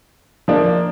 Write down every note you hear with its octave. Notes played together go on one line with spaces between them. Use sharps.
F3 A#3 D4